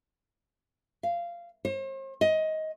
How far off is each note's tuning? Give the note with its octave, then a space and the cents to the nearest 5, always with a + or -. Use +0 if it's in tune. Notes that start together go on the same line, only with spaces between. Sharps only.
F5 -15
C5 +45
D#5 +15